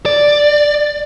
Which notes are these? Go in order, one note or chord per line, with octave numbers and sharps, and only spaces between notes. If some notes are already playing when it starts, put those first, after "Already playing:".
D5